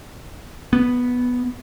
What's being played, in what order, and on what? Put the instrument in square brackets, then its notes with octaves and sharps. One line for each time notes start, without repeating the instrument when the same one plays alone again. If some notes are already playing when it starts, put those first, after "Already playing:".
[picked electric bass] B3